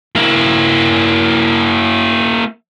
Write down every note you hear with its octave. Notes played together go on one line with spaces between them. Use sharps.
A#3 E4